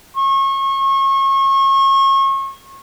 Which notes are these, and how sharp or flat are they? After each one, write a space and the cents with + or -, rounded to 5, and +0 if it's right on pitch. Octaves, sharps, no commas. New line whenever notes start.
C#6 -35